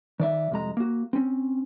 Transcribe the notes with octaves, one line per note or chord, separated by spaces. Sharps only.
D#3 D5 E5
C2 F2 G#3 A#5
A#3 F#4
C4 C#4